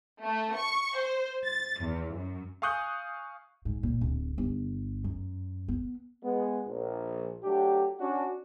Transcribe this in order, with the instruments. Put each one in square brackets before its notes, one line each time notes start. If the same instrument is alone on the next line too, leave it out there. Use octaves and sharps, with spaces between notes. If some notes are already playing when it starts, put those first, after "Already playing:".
[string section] A3
C#6
C5
A6
E2
F#2
[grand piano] F5 G#5 C#6 D#6 F#6 G6
[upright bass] G#2
A#2
D1
G1
F#2
B3
[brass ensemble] G#3 B3
A#1
F#3 A3 D4 G4
C#4 D4 F#4